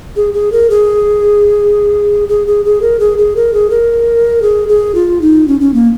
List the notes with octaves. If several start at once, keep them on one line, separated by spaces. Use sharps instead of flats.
G#4
G#4
A#4
G#4
G#4
G#4
G#4
A#4
G#4
G#4
A#4
G#4
A#4
G#4
G#4
F4
D#4
C#4
C#4
A#3